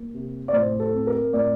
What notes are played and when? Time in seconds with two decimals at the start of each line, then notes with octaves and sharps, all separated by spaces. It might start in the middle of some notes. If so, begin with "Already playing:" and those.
Already playing: A#3
0.14 C3
0.48 D5
0.53 A2 C5
0.80 A4
0.93 C4
1.07 A#4
1.33 A2 D5